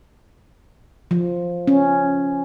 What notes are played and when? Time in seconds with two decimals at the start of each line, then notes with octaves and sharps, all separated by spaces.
1.11 F3
1.67 C#4